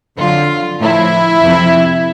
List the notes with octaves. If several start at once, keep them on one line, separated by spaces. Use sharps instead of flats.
F2 D3 F#3 F4
A2 F3 E4
F2 C3 F3